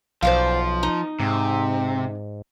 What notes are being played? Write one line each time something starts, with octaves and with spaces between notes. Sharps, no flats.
B1 F3 C5 D5 F5
D#4
G#2 C3